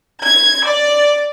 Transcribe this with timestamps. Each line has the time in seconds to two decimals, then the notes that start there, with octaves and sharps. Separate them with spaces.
0.23 G#6
0.64 D5